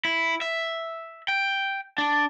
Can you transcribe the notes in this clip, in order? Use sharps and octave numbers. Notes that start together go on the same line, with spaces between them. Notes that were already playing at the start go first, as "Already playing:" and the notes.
E4
E5
G5
D4